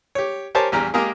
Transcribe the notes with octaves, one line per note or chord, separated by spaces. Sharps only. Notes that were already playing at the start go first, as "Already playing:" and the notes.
G4 C#5
G4 A#4 C5 C#5 G#5 A5
A#1 E2 G3 G4 A#5 F6
G#3 A#3 G4 G#4 A#4